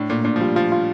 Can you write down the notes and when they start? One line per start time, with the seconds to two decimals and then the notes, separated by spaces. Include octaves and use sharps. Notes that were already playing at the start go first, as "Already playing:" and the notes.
Already playing: A2 D4
0.10 A#2 A3
0.25 A#2 D4
0.36 F3
0.41 G3 F4
0.56 F3 F4
0.72 F4